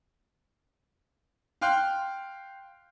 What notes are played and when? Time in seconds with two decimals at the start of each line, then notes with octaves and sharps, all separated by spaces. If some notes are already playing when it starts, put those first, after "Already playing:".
1.61 F5 G5 C6 F6 F#6